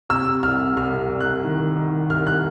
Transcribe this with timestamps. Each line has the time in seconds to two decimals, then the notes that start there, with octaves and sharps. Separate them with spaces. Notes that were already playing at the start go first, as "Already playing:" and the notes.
0.09 C3 E6
0.43 C2 F6
0.76 C2 F6
1.09 C2
1.20 F#6
1.44 D#3
1.76 D#3
2.10 C2 F6
2.27 F#6